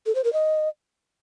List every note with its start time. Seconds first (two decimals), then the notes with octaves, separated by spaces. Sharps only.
0.06 A4
0.15 C5
0.24 A#4
0.33 D#5